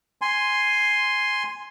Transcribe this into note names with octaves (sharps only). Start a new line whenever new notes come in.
G#5 C6